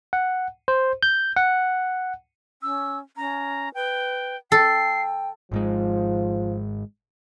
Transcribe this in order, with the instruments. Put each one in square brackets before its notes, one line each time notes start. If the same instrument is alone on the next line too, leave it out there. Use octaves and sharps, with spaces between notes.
[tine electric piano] F#5
C5
G6
F#5
[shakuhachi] C#4 [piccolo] E6
[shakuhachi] C#4 [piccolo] A#5
[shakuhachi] B4 [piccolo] G5
[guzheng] A4 [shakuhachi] G5 [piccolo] C7
[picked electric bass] G#1 G#2 G#3 [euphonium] F3